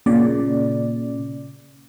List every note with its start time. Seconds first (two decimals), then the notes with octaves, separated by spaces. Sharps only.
0.06 A#2 C#3 D5